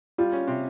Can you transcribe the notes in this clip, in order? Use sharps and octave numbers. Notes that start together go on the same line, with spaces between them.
G3 F4
C#4
C3